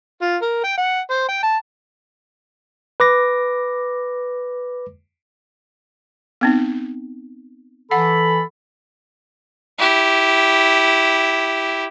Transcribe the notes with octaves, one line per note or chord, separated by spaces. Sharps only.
F4
A#4
G5
F#5
C5
G5
A5
B4 D6 A#6
B3 C4 D#4
E3 A4 F#5 B5
E4 G4